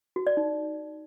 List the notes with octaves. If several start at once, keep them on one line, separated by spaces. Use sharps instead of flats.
F#4
D5
D#4